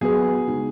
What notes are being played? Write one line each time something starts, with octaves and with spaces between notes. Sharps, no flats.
F#3 B3 F#4 G#4 B4
C#3 G#3 D#4 F#4